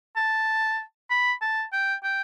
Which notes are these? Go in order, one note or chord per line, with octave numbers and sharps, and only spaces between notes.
A5
B5
A5
G5
G5